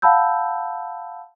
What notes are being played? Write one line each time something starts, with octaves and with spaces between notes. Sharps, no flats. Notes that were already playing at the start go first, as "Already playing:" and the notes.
F5 F#5 A5 B5 E6 G6